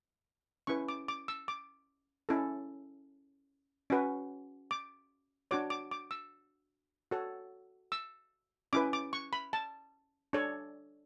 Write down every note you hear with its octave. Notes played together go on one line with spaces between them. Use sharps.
C#4 E4 B4 C#6
D6
D6
E6
D6
C#4 E4 A4
C#4 F#4 B4
D6
D4 F#4 C#5 D6
D6
D6
E6
F#4 A4 C#5
E6
C#4 E4 B4 D6
D6
C#6
B5
A5
D4 A4 C#5